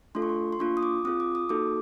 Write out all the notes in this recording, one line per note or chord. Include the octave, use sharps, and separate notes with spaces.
A3 D4 F4 A4 C6
C#6
C6
C6
A#3 D4 F4 C#6
D#6
D6
C4 F4 G#4 D#6
D6
D#6
A#3 D#4 F#4 A4 D6